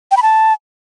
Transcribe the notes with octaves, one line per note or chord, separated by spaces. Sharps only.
G5
B5
A5